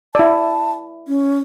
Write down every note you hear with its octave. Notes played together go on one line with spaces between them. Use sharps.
E4 D5 A5
C#4